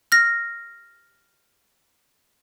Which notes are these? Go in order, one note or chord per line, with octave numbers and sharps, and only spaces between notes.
F6 A#6